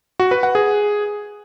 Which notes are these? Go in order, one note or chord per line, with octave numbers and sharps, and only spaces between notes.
F#4
B4
F#5
G#4